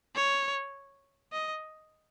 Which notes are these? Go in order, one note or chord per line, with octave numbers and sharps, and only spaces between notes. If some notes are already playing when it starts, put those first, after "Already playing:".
C#5
D#5